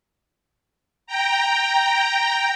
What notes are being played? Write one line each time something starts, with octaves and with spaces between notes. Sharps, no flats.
G5 A#5